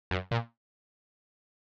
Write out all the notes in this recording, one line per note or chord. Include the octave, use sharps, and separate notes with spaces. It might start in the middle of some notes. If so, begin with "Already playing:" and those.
F#2
A#2